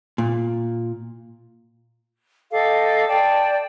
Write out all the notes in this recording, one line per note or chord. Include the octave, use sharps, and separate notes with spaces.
A#2
G4 A4 D#5 F5
D5 G5 A5